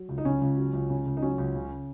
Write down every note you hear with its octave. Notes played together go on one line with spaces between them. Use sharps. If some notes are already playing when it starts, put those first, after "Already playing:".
Already playing: F#3
C#2
D#4
C#3 C#4
C#2
F#3
C#2
C#3
C#2
D#4
F#3 C#4
C#2
C#3